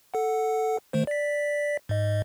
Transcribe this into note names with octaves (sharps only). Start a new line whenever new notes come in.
A4 F#5
D#3 A3 C5
D5 B6
G#2 D#5